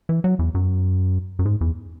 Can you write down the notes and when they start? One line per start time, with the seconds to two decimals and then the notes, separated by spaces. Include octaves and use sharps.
0.09 E3
0.24 F#3
0.39 E2
0.55 F#2
1.39 F#2
1.45 G#2
1.61 E2